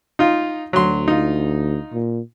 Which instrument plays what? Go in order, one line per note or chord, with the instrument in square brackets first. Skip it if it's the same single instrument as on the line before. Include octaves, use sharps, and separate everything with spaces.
[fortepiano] D#4 F4
[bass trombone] D2 [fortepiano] F#3 C6
[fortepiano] D#4 F4
[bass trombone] A#2